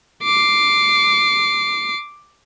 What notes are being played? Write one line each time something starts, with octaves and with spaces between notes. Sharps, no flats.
D6 C7